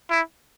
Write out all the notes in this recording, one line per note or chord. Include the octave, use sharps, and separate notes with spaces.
E4